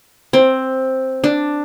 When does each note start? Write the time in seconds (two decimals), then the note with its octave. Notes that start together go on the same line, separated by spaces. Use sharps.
0.33 C4
1.24 D4